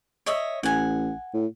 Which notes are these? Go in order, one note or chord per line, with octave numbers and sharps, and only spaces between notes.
C#5 D#5 E5
A1 F#5 G#5
A2